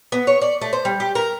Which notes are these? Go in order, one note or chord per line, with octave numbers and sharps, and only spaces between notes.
B3
C#5
D5
A3
C5
G3
G4
A#4